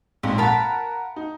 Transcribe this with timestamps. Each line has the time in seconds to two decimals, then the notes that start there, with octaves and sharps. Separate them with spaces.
0.23 A#1 F2 G#2 C#4
0.38 A#4 F5 F#5 A5 B5
1.16 D#4